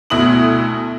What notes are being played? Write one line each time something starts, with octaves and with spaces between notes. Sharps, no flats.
D2 B2 E4 D#6 F#7